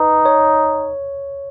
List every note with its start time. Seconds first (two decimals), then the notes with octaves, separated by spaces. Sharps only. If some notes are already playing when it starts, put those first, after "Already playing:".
Already playing: D#4 B4
0.26 C#5